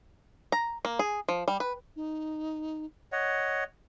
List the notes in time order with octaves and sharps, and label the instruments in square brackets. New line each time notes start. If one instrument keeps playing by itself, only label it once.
[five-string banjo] A#5
A#3
G#4
F3
G3
B4
[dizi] D#4
[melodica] C#5 D#5 F#5